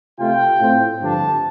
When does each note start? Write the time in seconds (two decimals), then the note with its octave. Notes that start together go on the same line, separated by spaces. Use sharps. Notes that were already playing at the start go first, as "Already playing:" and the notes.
0.18 C3 A3 F4 G5
0.60 A2 A3 C4 F4
1.02 G2 D3 F3 D4 A5